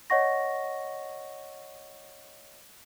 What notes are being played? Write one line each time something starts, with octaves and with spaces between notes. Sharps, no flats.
C#5 D#5 F#5 C#6 A#6